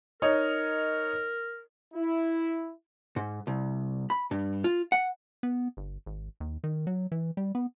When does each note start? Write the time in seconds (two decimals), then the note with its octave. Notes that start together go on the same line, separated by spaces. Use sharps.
0.22 D#4 A#4 C#5 D#5
1.94 E4
3.16 G#2
3.47 C2
4.10 B5
4.31 G2
4.64 F4
4.92 F#5
5.43 B3
5.77 G1
6.06 G#1
6.40 D#2
6.64 D#3
6.87 F#3
7.12 E3
7.37 G3
7.55 B3